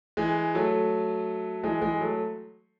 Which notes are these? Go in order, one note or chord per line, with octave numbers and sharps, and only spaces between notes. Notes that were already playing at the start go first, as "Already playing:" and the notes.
E3 G#3
F#3 A3
E3 G#3
E3 G#3
F#3 A3